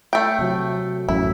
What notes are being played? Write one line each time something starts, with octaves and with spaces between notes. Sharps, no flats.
A3 G5
C3 F#3
A1 F#2 A2 E4